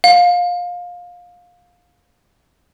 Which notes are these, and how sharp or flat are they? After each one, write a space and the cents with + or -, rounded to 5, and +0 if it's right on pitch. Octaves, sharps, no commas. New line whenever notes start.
F5 +20